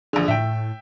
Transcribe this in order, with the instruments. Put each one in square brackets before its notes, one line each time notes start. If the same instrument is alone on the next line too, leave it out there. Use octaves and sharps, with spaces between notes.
[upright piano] A#1 D3 [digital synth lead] G#4
[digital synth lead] A2 [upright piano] E5 G5